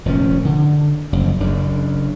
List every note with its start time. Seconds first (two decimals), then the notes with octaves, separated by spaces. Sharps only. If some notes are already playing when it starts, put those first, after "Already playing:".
0.06 F1 A#2 D#3 C#4
0.45 D3
1.12 F#1 F#2 F3
1.40 F#1 F#2 C#3 D4